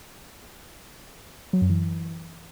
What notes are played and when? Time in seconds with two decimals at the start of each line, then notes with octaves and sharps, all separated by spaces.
1.53 F#3
1.61 F#2
1.70 E3